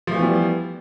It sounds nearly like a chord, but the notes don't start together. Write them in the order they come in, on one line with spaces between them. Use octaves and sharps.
F3 A3 E3 B3 G3